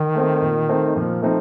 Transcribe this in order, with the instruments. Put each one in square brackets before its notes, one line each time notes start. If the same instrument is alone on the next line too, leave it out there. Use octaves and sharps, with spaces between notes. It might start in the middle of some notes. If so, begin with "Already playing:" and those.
Already playing: [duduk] D#3
[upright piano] A3 C4
A#2
A3 C4 D#4
[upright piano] A#2 [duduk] F3
[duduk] F3 [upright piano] A3 C4 D#4